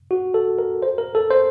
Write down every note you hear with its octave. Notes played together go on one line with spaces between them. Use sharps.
F#4
A4
A#4
C5
A#4
A4
C5